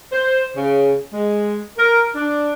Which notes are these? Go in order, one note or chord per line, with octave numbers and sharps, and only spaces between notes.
C5
C#3
G#3
A#4
D4